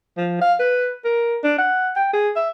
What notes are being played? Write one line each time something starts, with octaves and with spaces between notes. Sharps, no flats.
F3
F5
B4
A#4
D4
F#5
G5
G#4
E5